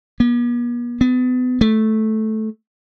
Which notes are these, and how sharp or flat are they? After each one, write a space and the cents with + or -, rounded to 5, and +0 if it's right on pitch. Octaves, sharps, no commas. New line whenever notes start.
B3 -45
B3 +30
A3 -10